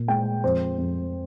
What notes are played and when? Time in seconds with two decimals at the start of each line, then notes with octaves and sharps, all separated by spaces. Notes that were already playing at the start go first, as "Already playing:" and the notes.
Already playing: A#2
0.08 G#3 G5
0.44 F2 C5
0.78 F2